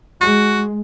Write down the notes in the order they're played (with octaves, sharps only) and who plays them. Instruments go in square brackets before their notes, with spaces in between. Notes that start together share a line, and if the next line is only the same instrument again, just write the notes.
[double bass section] G#3 [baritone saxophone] F#4